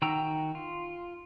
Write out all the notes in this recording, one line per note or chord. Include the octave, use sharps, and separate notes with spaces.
D#3 F#4 G5 A#5 E6
F4